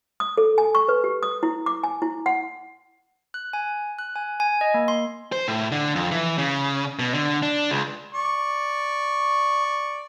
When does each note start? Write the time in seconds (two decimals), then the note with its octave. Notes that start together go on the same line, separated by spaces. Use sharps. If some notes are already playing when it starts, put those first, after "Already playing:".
0.20 D#6
0.37 A4
0.58 G#5
0.75 C#6
0.89 B4
1.04 G4
1.23 D#6
1.43 E4
1.66 D6
1.83 G#5
2.02 E4
2.26 F#5
3.34 F#6
3.53 G#5
3.99 F#6
4.16 G#5
4.40 G#5
4.61 D#5
4.74 A#3
4.88 C6
5.32 C5
5.48 A2
5.72 D3
5.96 F2
6.11 E3
6.38 C#3
6.99 B2
7.14 D3
7.42 D4
7.70 C#2
8.14 D5 C#6